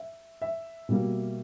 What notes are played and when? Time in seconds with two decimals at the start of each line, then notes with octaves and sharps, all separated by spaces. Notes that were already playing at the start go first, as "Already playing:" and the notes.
Already playing: E5
0.42 E5
0.89 B2 G3 A#3